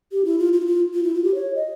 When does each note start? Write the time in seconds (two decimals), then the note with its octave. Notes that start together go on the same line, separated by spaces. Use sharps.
0.12 G4
0.25 E4
0.39 F4
0.53 F4
0.60 E4
0.66 F4
0.94 F4
1.03 E4
1.14 F4
1.24 G4
1.35 C#5
1.55 D#5